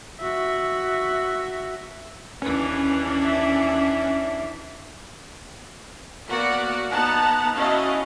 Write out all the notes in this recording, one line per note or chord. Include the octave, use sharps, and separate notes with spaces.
F#4 E5
D#2 E3 C#4 D4 B4
E5
A#3 B3 F#4 D5 F#5
B3 D#4 F#5 A5 A#5
C#4 E4 F#4 D#5 F5 A5